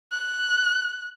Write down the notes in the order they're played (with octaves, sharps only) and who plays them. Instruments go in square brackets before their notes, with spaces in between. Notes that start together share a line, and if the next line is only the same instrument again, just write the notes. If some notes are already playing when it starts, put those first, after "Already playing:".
[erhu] F#6